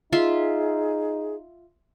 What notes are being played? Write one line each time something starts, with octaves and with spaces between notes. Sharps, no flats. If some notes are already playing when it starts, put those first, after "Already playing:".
D#4 F4 G#4 E5 C6